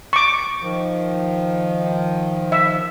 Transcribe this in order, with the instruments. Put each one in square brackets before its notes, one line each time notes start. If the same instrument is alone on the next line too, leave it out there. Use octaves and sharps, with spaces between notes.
[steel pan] C#6 D6
[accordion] D#3 F3
[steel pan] E5